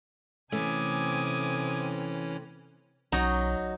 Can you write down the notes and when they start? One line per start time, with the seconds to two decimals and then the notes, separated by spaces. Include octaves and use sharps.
0.52 C3 E3 A3 C4 C#4 G#5 D6 D#6
3.12 B1 F#3 D#4